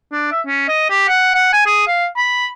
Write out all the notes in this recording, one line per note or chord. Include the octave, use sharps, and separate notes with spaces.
D4
E5
C#4
D#5
G4
F#5
F#5
G#5
G#4
F5
B5